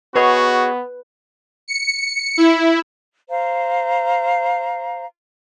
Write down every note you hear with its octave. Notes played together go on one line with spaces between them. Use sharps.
B3 F#4 G#4 B4 C#5 D#5
C#7
E4
C5 F5 A#5